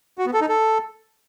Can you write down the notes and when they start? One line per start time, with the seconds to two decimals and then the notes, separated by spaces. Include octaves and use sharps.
0.18 F#4
0.26 B3
0.33 A4
0.41 D#4
0.49 A4